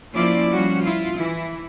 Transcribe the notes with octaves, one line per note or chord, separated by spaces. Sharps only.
F3 A#3 C#4 E4 F4 D5
F3 G3 C#4 F#4
E4 F4
E3 E4